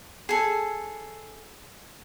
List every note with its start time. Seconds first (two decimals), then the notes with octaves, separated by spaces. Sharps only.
0.29 G#4 A4